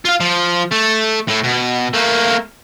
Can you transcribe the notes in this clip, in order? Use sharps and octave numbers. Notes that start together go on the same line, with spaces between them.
F4 F5
F3
A3
A2 A3
B2
A3 A#3